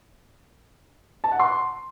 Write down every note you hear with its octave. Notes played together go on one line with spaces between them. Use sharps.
A5
F#5
C6